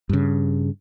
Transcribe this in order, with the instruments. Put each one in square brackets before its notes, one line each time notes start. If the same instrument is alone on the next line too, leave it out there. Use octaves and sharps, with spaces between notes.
[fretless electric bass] G2 C#3